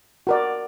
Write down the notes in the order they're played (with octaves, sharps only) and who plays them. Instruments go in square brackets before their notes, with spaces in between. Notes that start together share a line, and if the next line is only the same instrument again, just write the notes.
[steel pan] F#4 A#4 D5